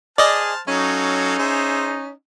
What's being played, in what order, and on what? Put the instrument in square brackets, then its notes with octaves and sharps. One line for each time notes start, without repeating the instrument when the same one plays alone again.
[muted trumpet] G#4 [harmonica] C5 A5 F6 [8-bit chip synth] D5 D#5
[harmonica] F#3 A4 F5 [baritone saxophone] C#4 [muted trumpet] D#4
[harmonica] G#4 C5 E5